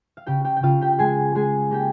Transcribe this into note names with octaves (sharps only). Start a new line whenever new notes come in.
F5
C#3 G4 G5
G4 G5
G5
C#3 F4 F5
G4 G5
G5
G#3 G#4 G#5
G#3 G#4 G#5
A#3 G4 G5